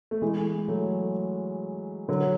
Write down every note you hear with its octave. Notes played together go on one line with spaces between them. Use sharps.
A3
E3 G#3
F#3 A3
D3 F#3